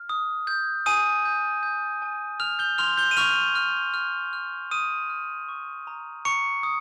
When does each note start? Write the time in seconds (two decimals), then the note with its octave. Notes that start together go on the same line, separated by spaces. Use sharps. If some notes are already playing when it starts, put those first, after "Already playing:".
Already playing: F6
0.09 D#6
0.47 G6
0.86 G#5 D#6 D#7
1.25 G6
1.63 G6
2.02 G#5
2.40 F6 F7
2.59 G6 G7
2.78 C6 F6 F7
2.97 G6 G7
3.11 D#7
3.17 C#6 F6 F7
3.55 F6
3.94 F6
4.33 F6
4.71 D#6 F6 D#7
5.10 F6
5.49 C#6
5.87 A#5
6.25 A#5 C#6 C#7
6.63 D#6